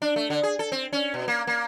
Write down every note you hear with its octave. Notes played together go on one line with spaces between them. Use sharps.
D4
A3
D3
G#4
A4
C4
C#4
B2
A#3
A#3